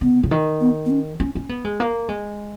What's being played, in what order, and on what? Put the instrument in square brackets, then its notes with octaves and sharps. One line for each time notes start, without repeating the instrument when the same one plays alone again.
[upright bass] C#3 [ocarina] B3
[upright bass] C#3
D#3
[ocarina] B3
B3
C#4
[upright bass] C#4
C#4
B3
G#3
A#3
G#3